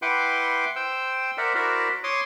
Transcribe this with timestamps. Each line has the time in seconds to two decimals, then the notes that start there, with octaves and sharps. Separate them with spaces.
0.02 E4 B4 F#5 G5 C6 D6
0.76 C5 G5 E6
1.38 A#4 C5 D5 E5 F#5
1.55 E4 F#4 A#4 C5 D5 E5
2.04 C#5 C6 D6 D#6